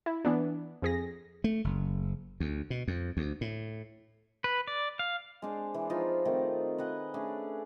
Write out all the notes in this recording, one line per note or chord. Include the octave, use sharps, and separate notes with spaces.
E4
E3 B3 D4
F2 G#4 A#6
A3
F#1
D2
B2
F2
D2
A2
B4
D5
F5
G#3 D4 C5
E3
F3 D#4 F4 A5
D#3 A3 C4
B4 D#5 F#5 G#5
A3 C#4 D4 G#4